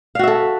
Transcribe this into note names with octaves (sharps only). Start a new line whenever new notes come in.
F#4 A4 E5 F5